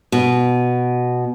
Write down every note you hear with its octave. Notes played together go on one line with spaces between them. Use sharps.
B2